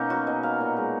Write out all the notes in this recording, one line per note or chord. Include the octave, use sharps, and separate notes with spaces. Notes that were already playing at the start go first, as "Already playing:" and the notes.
Already playing: B2 A#3 C#4 D#4
F#3 F#4
B2 D#5
A#3 F5
A#2
G#3